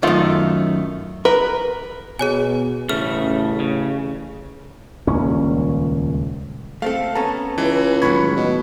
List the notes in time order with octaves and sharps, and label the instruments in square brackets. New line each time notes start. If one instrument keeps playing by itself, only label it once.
[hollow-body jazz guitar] F#2 D#3 [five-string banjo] A3 F4
[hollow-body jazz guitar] A#4 [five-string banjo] B4
[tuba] B2 [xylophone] G#4 C#5 G#5
[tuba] A1 [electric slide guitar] C#3 A3 [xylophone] F6
[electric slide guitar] C#3
[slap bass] D#1 C#2 C#4
[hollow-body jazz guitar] A3 C4 A4 [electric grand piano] F5
[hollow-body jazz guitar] B3 C#4 A4 [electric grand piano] A5 A#5
[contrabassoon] C#2 [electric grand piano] E3
[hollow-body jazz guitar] A2 D#3 F#3 [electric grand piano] B5 C#6 G#6
[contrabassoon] B2